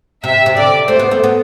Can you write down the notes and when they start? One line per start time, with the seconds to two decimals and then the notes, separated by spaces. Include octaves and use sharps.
0.24 C3 E5
0.46 C3
0.56 D3 D5
0.88 A3 C5
0.99 B3
1.11 A3
1.24 B3